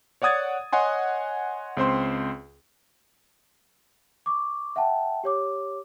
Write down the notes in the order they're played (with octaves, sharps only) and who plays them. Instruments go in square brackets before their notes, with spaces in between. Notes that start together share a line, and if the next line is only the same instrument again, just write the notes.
[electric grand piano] C#5 D5 F#5 D#6 G#6 A6
C#5 D#5 F#5 G#5 C6
C#2 C4 C5 C6
[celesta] C#6 D6
E5 F#5 G5 A5
G4 C#5 D6